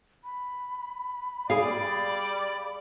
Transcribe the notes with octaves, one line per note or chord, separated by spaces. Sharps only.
B5
G3 G#4 D5 F5